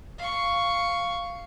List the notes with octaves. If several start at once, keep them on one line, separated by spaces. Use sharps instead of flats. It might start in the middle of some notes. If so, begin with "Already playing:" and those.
F5 C#6